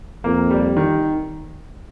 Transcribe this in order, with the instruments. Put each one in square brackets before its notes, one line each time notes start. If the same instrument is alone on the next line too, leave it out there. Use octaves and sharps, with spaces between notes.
[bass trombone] F2 [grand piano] A#3
[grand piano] G3
D#3